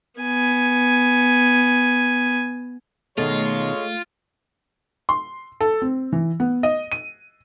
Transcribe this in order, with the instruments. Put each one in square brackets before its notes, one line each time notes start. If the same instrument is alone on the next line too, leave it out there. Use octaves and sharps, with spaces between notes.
[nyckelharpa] B3 G#5
[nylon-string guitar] B2 D#3 [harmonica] G#3 C#5 [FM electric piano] A3 [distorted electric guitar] F4
[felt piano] C6
A4
C4
E3
B3
D#5
D#7